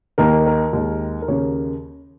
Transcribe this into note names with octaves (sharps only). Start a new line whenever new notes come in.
D#2 D#3 A#3 A#4
A#4
D#2 D#3 G#3
A#4
D#2 C#3 A#3 C#5